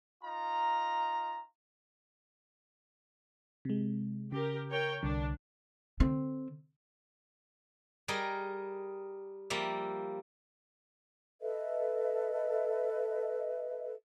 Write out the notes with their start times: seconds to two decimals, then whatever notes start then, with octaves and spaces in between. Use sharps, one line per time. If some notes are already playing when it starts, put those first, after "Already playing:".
0.24 D#4 F4 A#5
3.65 C3 G#3
4.32 C#3 G4 A#4
4.70 A#4 C#5 G5
5.03 C2 D3 D4
6.00 D3 C4
8.08 G3 G#4 A#4 D#5
9.50 F3 G3 A#3 E5
11.42 A4 B4 D#5 E5